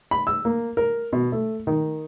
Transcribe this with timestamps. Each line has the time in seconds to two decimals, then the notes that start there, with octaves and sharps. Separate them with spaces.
0.11 B5
0.27 E6
0.45 A#3
0.77 A#4
1.13 B2
1.32 A3
1.67 D#3